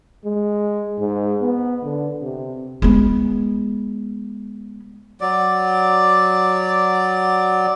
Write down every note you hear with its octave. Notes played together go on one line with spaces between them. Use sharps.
G#3
G#2
B3
D3
C3
G#3 B3
F#3 D5